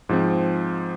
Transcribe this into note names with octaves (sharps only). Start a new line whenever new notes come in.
G#2 F3 C4